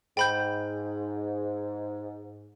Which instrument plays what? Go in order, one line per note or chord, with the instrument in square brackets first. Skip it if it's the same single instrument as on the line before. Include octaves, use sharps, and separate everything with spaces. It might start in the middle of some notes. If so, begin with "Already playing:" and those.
[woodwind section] G#2 [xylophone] G5 B5 G6